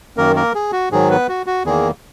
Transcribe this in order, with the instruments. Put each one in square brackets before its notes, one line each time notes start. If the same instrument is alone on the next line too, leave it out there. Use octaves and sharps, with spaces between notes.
[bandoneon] F#2 D#3 A#3 A#4
A#3 A#4
G#4
F#4
G#2 D#3 F#3 G#4
B3 B4
F#4
F#4
E2 D#3 A#3 G#4